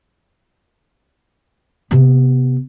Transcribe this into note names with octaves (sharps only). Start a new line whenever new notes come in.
C3 B3